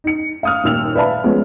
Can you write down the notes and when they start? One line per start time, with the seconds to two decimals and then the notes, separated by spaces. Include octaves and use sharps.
0.04 D#4 C#7
0.43 F5 D#6 F6
0.64 D#1 D#2 E6 F7
0.95 B4 D5 E5 F5 A5 B5
1.23 F3 G#3 B3 C#4